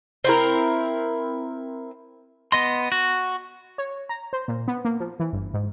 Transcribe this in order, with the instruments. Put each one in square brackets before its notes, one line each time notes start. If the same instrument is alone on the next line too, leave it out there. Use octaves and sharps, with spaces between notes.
[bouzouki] C4 E4 A#4
[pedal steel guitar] B3 D#5 C6
F#4
[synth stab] C#5
A#5
C5
A#2
B3
A#3
F3
E3
G1
G#2